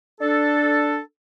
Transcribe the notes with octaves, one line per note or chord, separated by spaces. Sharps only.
D4 A4